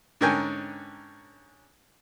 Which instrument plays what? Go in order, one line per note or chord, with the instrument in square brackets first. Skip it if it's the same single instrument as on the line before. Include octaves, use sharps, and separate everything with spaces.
[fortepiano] G#2 D3 C#4 A#4 G5 G#5